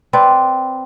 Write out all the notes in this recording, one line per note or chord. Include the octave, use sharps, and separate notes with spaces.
C4 B4 D5